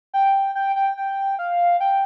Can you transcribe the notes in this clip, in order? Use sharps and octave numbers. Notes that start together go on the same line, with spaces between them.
G5
G5
G5
G5
F5
G5